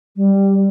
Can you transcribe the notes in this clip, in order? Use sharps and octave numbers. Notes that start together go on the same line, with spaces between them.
G3